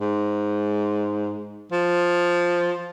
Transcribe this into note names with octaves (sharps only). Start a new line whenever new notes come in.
G#2
F3